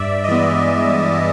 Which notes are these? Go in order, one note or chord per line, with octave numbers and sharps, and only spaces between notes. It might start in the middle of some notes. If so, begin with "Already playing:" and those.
Already playing: G2 D5 E5
D#5
E3 G#3 B3 D5 E5